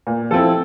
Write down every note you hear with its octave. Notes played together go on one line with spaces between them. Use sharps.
A#2
F3 C4 E4 A4